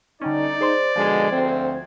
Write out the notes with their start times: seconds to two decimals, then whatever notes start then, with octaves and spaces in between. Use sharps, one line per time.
0.22 D3 G3 C#4 D#4 D5
0.61 G#4 C5 C6
0.96 B2 D3 F3 G#3 G#6
1.32 D2 C4